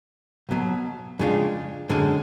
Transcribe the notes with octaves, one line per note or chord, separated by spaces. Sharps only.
B1 B2 F#3
F2 C#3 G#3 D4 F4
F#2 D3 G#3 C#4